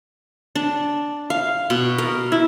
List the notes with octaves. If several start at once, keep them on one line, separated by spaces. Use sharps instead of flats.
D4
F5
B2
A#4
E4